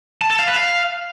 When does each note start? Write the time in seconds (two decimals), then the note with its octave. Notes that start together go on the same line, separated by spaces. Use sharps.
0.22 A5
0.30 A4
0.39 F5
0.48 B4
0.56 F5